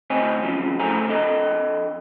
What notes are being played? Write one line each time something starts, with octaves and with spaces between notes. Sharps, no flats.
D2 C4 C5 C#5 D#5 G#5
E2 C#3 F3 F#3
A2 C#3 A4 C5 G#5 A#5
F2 D4 A4 D#5